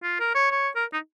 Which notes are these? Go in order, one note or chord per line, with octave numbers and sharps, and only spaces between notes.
F4
A#4
C#5
C#5
A#4
D#4